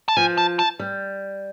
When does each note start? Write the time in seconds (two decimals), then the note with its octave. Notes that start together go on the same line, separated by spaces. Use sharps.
0.08 A5
0.16 F3 G#5
0.38 A5
0.59 A5
0.80 G3